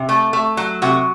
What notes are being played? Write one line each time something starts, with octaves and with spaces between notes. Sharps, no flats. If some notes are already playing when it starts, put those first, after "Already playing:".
Already playing: C3
A3
A3
F#3
C3 F#4